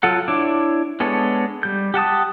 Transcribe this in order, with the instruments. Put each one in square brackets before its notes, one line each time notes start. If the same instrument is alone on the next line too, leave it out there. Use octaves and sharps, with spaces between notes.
[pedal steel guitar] F#3 F4 A4 F#5
D4 E4 C#5 D6
G#3 B3 D4 A4 C#5
G3 G6
G4 F#5 A5 D#6